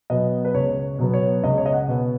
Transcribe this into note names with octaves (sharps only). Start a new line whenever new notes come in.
B2 F#3 B3 D#5
B4
C#2 C#5
B2 F#3 B3
C#5
C#2 D#5
C#5
D#5
F#5
B2 B3